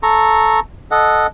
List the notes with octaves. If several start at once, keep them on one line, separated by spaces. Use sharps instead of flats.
A4 A#5 C#6
A4 D#5 F#5